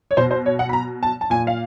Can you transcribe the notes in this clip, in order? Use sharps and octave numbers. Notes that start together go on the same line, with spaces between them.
C#5
B2 C5
C5
C#5
F#5
B5
A#5
A5
A5
A#2 G#5
F5